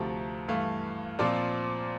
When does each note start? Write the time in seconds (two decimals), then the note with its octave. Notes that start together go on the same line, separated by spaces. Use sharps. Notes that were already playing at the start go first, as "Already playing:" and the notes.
Already playing: D2 C3 F3 A3 A#5
0.48 G2 E3 A3 F5
1.19 A#2 F3 C4 F4 D5